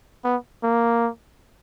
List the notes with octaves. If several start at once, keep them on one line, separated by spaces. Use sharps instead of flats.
B3
A#3